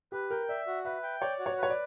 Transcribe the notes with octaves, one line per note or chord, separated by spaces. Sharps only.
G4 B4
A#4 G5
D5 E5
F#4
B4 E5
G5
C#5 D5
F#4
C#5
B4
C#5
D5